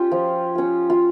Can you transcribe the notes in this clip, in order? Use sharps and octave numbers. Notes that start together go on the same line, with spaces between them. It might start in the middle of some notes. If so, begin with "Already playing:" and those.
Already playing: C#4 F4 G4
F3
C#4 F4
F4